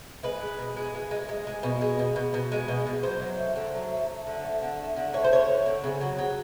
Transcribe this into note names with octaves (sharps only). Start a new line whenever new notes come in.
G#3 B4
G#3
B2
G#3
G#3
G#3
G#3
G#3
B2
G#3
B2
B2
B2
G#3
B2
B2
F#3 C5
F#3
A3
D3
F#3
A3
A3
D3
A3
D3
A3
D3
A3 C#5
C5
D3 C#5
D3
D3
C#3
F#3
F#3